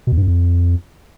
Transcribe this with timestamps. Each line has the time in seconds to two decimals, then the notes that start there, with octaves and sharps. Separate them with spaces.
0.07 B2
0.12 E2
0.17 G2
0.22 F#2
0.28 F2